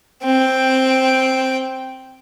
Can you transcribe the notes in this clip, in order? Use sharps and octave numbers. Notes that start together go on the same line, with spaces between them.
C4 G5